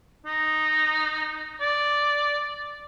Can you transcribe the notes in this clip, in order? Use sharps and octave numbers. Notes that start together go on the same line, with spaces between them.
D#4
D5